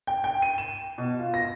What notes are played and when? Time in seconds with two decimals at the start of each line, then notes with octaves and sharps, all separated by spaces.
0.07 G5
0.24 G5
0.42 D#7
0.58 E7
0.98 B2
1.19 F4
1.34 A#6